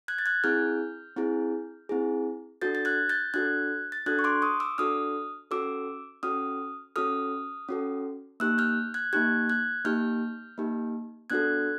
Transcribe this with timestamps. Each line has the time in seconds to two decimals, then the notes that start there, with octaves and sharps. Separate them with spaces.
0.08 F#6 G#6
0.18 A6
0.26 F#6 G#6
0.44 C4 E4 G#4 F6 G6
1.17 C4 E4 G#4
1.89 C4 E4 G#4
2.61 D4 F#4 A4 G6 A6
2.75 A6
2.85 F#6 G#6
3.09 G6 A6
3.34 D4 F#4 A4 F#6 G#6
3.92 A6
4.06 D4 F#4 A4 F#6 G#6
4.19 C#6
4.24 C6 D6
4.42 C#6 D#6
4.60 D6 E6
4.78 D4 F#4 A4 D#6 F6
5.51 C#4 F#4 A4 D6 E6
6.23 C#4 F#4 A4 D#6 F6
6.96 C#4 F#4 A4 D#6 F6
7.69 C#4 F#4 A4
8.40 A#3 D#4 G4 E6 F#6
8.58 F6 G6
8.94 F#6 G#6
9.13 A#3 D#4 G4 F#6 G#6
9.49 F#6 G#6
9.85 A#3 D#4 G4 F6 G6
10.58 A#3 D#4 G4
11.30 B3 D4 F#4 A4 F#6 G#6